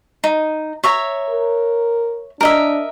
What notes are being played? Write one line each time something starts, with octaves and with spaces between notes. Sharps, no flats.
D#4
C#5 E5 A#5
A#4
D4 A#4 D#5 E5